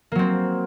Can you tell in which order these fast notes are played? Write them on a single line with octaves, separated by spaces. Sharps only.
A#3 F#3 C4